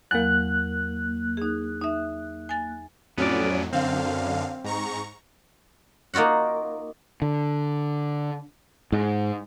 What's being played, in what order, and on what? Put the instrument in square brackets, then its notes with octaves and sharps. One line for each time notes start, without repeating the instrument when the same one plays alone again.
[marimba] E2 F#3 [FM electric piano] A#3 F#6
[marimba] D#4 G#4
D#4 E5
G#5 A6
[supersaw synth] F2 A2 F#3 [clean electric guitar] B3 C#4 D5
[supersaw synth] F#2 D3 F5 [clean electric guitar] C4
[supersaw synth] G#2 A#5 C#6
[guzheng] A#3 D#4 F4 F#4 F#5
[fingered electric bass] D3
G#2